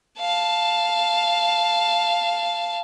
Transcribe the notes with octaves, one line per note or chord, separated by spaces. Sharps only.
F5 A5